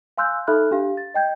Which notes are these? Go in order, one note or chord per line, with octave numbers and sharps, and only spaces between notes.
F5 G#5 C6 E6 F#6 G6
D#4 A4 E5 B5 F6 F#6
D4 G4 F5
A6
D#5 G5 G6 G#6